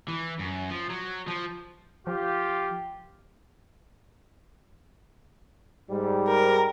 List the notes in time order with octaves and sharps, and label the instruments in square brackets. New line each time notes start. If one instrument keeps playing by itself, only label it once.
[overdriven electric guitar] E3
F#2
F3
F#3
F3
[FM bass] F3 [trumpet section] F4 G4
[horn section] G#2 G3
[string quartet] A#4